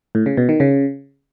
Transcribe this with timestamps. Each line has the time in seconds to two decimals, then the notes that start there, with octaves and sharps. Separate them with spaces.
0.15 A2
0.26 C#3
0.37 B2
0.49 D#3
0.60 C#3